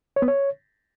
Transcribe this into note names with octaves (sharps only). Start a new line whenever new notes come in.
C#5
B3
C#5